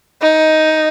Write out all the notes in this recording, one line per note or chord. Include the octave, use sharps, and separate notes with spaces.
D#4